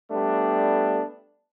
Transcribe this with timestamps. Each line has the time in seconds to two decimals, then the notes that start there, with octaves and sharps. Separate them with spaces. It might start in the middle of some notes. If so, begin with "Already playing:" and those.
0.10 G3 A3 B3 D4